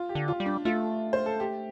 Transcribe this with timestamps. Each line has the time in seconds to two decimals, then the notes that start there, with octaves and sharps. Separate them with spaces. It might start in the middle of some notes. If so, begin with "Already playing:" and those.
Already playing: F4
0.09 G4
0.15 D3
0.28 F4
0.40 G3
0.46 D4
0.65 A3 F4
1.13 C5
1.26 A4
1.40 G4